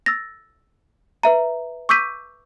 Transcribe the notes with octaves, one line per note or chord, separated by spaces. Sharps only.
E6 A6 A#6
B4 E5 A#5
C#6 D6 E6 G6 B6 D#7